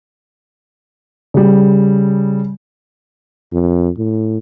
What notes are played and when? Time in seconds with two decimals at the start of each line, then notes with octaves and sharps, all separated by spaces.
1.34 C#3 G3
3.52 F2
3.98 A2